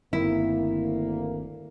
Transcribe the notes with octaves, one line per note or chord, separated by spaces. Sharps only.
G1 D2 D#3 A#3 C4 E4